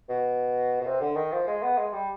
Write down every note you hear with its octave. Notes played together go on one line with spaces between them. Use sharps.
B2
B2
C3
D3
D#3
F3
G#3
B3
G#3
G3